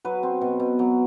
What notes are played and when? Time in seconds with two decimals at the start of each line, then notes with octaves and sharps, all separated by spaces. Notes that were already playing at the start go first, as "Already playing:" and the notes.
0.05 F#3 B4
0.23 C4
0.41 B2
0.60 B2
0.79 F#3